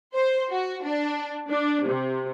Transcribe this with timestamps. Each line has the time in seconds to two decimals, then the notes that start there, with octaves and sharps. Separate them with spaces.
0.15 C5
0.52 F#4
0.83 D4
1.50 D4
1.87 C3